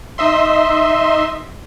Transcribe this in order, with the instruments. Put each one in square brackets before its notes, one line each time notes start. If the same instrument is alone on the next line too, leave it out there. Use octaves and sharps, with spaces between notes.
[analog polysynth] D#4 D#5 E5 C6